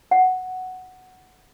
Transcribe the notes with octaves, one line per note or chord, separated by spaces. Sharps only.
F#5